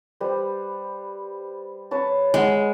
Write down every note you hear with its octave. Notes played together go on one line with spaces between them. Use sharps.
G3 B4 C5
B4 C#5 A5
G#3 G#4 F#5